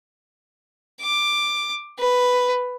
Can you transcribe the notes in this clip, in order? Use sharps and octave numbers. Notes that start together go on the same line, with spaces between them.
D6
B4